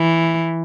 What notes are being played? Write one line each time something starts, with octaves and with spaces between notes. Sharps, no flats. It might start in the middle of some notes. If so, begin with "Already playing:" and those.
Already playing: E3